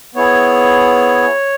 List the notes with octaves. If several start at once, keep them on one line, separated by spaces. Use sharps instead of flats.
B3 E4 G#4 C#5